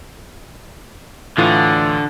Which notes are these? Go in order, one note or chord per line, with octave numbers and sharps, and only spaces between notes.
A2 D3 E3 F4